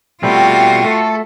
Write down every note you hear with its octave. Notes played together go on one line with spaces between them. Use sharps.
B2 G3 A3 C4 F4 F#4 G5
A3 A4